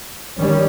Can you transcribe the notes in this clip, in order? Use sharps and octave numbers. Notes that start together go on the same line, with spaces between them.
D#3 G3 C#4